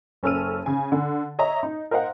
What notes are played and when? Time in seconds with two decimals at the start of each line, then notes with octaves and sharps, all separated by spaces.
0.23 F#1 C#4 A4 E6 F6 D#7
0.66 C#3 G#5
0.92 D3
1.39 C#5 D#5 E5 A#5
1.63 D#4
1.91 A#4 C5 D#5 F5 F#5